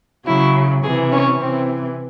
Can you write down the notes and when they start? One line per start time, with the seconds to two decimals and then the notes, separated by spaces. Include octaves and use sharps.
0.27 C#3 F#3 E4
0.83 C3 E3 G#4
1.12 C#4
1.40 C3 E3 C4